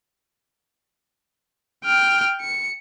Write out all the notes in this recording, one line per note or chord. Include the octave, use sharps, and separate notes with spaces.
G5 F6
C#7